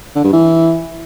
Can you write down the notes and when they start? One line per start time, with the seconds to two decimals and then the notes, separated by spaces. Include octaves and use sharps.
0.16 D3
0.24 G2
0.33 E3